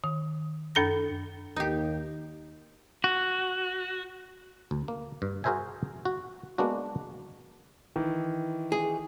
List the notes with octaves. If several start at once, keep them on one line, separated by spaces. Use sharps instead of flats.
D#3
F#2 D4 A4 A#5 A#6
D#2 D#4 G4
F#4
D2
A#3
G2
F#4 G#4 A#4 C5 E5 G#5
F#4
G#3 A#3 B3 D4 F#4
D#3 E3
G#4